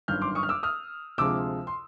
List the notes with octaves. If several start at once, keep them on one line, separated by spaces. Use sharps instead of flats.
G1 F#2 D#3 F6 G6
C6 D6
C#6 D#6
F6
D6 E6
D#6 F6
D2 C3 F3 G#3 D6 E6
C6